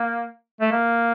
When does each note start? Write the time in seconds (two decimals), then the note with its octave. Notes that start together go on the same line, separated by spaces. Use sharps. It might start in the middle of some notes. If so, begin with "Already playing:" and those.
Already playing: A#3
0.61 A3
0.72 A#3